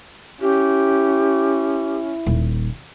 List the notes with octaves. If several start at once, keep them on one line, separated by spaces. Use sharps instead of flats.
C#4 E4 G4
D#1